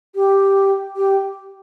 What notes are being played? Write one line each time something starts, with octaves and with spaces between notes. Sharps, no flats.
G4
G4